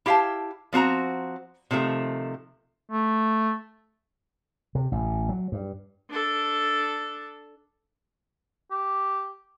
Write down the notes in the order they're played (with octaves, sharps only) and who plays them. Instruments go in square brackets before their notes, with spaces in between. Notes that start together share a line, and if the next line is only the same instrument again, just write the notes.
[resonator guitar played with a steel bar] E4 G4 F5 G5 A5
F3 C4 F#4 A#5
C3 D#3 F3 A3
[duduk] A3
[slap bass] C3
A1
F#3
G2
[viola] D4 A4
[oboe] G4